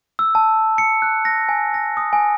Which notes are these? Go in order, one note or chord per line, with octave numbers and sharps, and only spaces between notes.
E6
A5
C#7
F#6
A#6
G#5
A#6
D#6
G#5